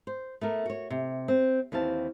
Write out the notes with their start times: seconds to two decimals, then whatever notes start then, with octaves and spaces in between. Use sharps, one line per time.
0.07 C5
0.41 A3 B3 A#4
0.66 F#4 C#5
0.90 C3
1.28 C4
1.72 D#2 E3 C4 F5 A5